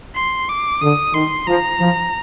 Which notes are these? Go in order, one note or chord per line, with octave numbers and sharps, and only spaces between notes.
C6
D6
D3 D#6
D#3 C6
F3 A#5
F3